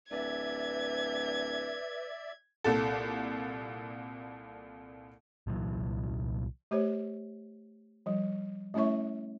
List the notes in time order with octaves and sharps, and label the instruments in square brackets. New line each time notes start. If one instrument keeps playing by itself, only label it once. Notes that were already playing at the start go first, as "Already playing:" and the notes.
[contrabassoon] D1 [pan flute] B4 [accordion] D5 E5 [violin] G#6
[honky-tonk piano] C2 A#2 A4
[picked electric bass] C2 A#2 E3 F#3
[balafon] A3 G4 C5 C#5
F3 G3
A3 C#4 E4 C#5 E5 C#6